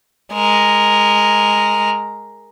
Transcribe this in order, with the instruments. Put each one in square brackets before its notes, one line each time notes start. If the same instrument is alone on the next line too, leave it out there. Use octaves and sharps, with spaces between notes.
[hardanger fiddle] G#3 A#4